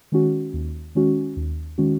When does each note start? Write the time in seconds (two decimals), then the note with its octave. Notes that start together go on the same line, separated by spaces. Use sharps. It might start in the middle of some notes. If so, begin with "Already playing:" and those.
0.12 D#3 G#3 C#4 F#4
0.54 D#2
0.95 D#3 G#3 C#4 F#4
1.37 D#2
1.78 D#3 G#3 C#4 F#4